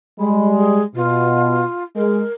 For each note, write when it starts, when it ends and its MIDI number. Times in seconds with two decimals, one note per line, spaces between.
0.20 0.83 55
0.20 0.83 56
0.20 0.47 83
0.58 0.83 68
0.96 1.64 47
0.96 1.84 65
1.96 2.22 56
1.96 2.33 70